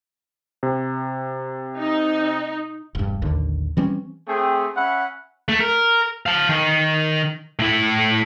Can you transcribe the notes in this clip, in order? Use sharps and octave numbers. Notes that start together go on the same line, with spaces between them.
C3
D#4
E1 G2
A1 D#2 D3
E3 G3 C4 C#4
A3 C4 G#4 G5
C#4 E5 F#5 B5
A3
A#4
F5 A5
D#3
A2 E4